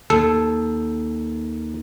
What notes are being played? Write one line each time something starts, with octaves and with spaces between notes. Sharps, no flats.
D#2 A4